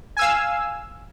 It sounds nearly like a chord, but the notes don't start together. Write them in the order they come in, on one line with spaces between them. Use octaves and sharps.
G#5 E6 F5